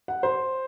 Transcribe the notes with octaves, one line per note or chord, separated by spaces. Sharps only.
F#5
C5